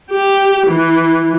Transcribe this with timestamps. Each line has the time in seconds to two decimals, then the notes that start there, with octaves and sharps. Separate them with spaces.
0.11 G4
0.67 E3